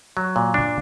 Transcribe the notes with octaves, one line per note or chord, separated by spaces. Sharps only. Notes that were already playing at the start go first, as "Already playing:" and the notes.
F#3
A#2
D4